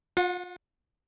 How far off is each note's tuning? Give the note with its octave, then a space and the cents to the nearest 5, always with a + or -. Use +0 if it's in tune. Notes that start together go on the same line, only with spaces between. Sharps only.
F4 +30 F#5 -25